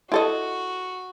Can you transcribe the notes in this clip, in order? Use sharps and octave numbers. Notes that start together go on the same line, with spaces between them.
E4 F#4 A4 D#5